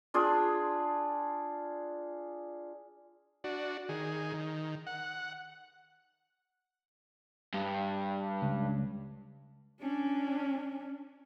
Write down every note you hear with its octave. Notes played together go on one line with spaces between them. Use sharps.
D4 F4 G#4 D5
D4 F#4
D#3 G#4
D#3
F#5
G2
C#2
C#4 D4